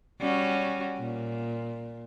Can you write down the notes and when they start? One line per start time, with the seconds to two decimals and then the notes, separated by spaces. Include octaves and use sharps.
0.21 G3 C#4 F#4
0.98 A#2